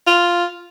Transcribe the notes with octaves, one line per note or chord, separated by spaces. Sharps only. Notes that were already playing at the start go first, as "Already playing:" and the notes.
F4